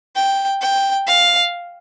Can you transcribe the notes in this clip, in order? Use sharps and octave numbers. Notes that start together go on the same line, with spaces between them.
G5
G5
F5